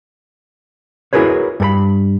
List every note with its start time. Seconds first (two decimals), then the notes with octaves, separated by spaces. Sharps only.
1.13 E4 F#4 G#4 A#4 B4 C#5
1.60 G2 A4 B5